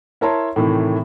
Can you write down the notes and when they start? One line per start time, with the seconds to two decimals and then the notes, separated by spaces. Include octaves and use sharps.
0.21 E4 A#4 C#5 A5 A#5 C6
0.56 A2 C3 D#3 E3